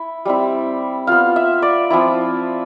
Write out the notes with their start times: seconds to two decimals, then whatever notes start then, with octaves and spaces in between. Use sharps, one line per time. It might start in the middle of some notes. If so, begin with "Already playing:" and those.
Already playing: E4
0.25 G3 C4 E4
1.07 B3 F4 F5
1.36 E5
1.62 D5
1.90 F3 C4 E4